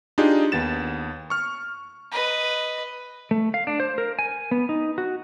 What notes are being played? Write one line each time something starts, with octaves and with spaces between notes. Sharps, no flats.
D4 D#4 F4 G4 G#4
D#2 B3 A6 E7
C#6 F6
B4 D#5
A3
F5
D4
C5
A#4
G#5
B3
D#4
F#4